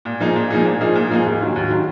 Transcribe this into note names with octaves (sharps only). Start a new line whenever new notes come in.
A#2
F3 A#3 D#4 G#4
A#2
F3 A#3 D#4 G#4
A#2
F3 A#3 D#4 G#4
A#2
F3 A#3 D#4 G#4
D#2
D#3 F#3
D#2
D#3 F#3